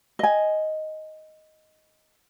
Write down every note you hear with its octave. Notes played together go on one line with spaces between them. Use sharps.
D#5 G#5